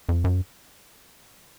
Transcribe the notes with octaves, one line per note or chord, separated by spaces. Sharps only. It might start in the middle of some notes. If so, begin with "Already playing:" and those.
F2
F#2